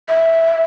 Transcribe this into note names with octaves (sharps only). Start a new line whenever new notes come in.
E5